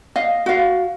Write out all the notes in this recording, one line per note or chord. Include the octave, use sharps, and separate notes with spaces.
D#5 F5
F#4 F5